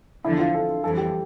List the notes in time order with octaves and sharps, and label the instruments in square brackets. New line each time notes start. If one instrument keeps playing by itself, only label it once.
[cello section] E2 D3 F3 [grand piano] E4
[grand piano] F4
A4
[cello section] F2 E3 G3 [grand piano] A4
[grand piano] G4